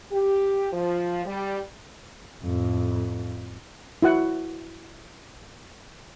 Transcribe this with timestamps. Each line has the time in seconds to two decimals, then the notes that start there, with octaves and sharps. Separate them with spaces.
0.12 G4
0.73 F3
1.26 G3
2.44 F2 A2
4.02 E4 F#4 F#5